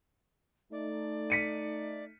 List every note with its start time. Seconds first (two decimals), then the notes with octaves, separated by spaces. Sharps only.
0.72 A3 D#4 D5
1.30 B6 C#7 D#7